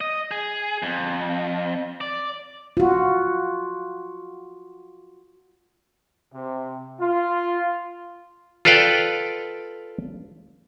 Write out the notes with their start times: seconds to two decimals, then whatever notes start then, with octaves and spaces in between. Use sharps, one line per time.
0.01 D#5
0.31 G#4
0.83 F2
2.01 D5
2.77 F4 F#4
6.34 C3
7.00 F4
8.65 F4 A4 B4 D5 F5 G5